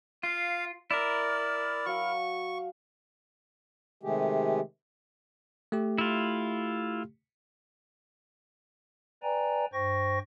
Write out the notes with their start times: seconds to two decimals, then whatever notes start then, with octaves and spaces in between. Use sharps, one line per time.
0.23 F4 F5
0.91 E4 A#4 D5
1.86 F#3 F5 C#6
4.03 C3 D#3 G#3 A3 G4 G#4
5.72 A3 G4
5.98 E4 F4
9.23 B4 D5 G5 G#5 A#5
9.73 G2 C5 G5 C#6 A#6